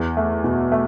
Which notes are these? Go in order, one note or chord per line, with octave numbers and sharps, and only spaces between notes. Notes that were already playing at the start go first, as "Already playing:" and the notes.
Already playing: E2
A3
B2
A3